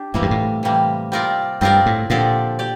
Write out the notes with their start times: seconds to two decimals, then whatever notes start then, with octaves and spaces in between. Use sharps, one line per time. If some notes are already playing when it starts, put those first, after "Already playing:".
Already playing: D4 G4
0.14 A2 C3 E3 G3 A#3
0.22 G2
0.31 A2
0.63 C3 E3 G3 A#3
1.12 G3 C4 F4 A#4 D5
1.61 G2 G3 C4 F4 A#4 D5
1.86 A2
2.10 A#2 D3 F3 C4 G4 D5
2.59 G4 D5